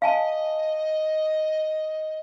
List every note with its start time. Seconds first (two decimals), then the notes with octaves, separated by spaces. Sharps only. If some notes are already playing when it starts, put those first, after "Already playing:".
0.02 D#5 F5 G#5 A5